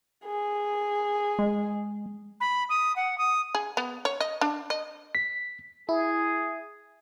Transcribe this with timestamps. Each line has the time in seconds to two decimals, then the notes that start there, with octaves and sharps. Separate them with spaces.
0.25 G#4
1.39 G#3
2.41 B5
2.69 D#6
2.96 F#5
3.18 D#6
3.55 G#4
3.77 B3
4.05 C#5
4.20 D#5
4.41 D4
4.70 D#5
5.15 B6
5.89 E4 G#4